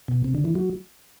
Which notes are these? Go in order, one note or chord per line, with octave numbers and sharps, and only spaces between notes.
B2
C3
D3
E3
F#3